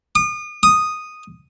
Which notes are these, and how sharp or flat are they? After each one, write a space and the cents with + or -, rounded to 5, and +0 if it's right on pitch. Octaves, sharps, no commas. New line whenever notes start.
D#6 -35
D#6 -5